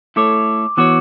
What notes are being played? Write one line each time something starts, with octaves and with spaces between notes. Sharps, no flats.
A3 E4 A4 C#5 D6
E3 B3 F#4 C#5 D6